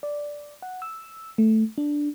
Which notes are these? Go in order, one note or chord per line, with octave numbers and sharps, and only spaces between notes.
D5
F#5
E6
A3
D4